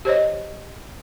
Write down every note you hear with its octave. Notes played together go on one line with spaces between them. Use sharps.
G4 C5 C#5 D#5